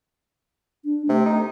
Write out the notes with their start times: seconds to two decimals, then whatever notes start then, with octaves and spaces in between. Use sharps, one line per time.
0.85 D4
1.09 C3 A3
1.25 D#4